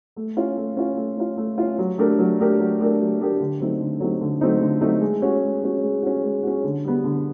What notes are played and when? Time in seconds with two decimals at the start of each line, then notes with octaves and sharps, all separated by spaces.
0.16 A3
0.37 C#4 F4
0.57 A3
0.77 C#4 F4
0.97 A3
1.17 C#4 F4
1.37 A3
1.58 C#4 F4
1.78 F#3
1.98 A3 D4 G4 A#4
2.19 F#3
2.39 A3 D4 G4 A#4
2.59 F#3
2.79 A3 D4 G4 A#4
3.00 F#3
3.20 A3 D4 G4 A#4
3.40 D3
3.60 F#3 A3 C4 D#4
3.80 D3
4.00 F#3 A3 C4 D#4
4.21 D3
4.41 F#3 A3 C4 D#4
4.61 D3
4.81 F#3 A3 C4 D#4
5.01 G#3
5.22 C#4 F#4
5.42 G#3
5.63 C#4 F#4
5.83 G#3
6.02 C#4 F#4
6.23 G#3
6.43 C#4 F#4
6.64 D3
6.84 G3 B3
7.04 D3